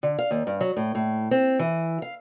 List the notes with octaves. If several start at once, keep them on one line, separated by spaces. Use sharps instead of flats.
D3
F5
D#2
G2
F#3
A2
A2
C4
E3
F5